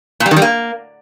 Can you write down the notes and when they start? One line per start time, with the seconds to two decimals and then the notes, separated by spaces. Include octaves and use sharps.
0.20 A#2
0.26 G3
0.31 D#3
0.36 G3
0.42 A#3